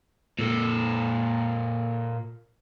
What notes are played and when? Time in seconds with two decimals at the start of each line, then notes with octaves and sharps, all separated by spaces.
0.39 A#2 A4